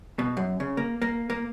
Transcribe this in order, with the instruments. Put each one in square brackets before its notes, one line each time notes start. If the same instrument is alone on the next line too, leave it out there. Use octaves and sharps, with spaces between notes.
[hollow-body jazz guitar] B2
F#2
C#3
A#3
A#3
A#3